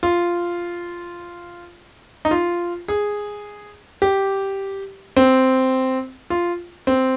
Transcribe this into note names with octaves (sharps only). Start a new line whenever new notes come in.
F4
D#4
F4
G#4
G4
C4
F4
C4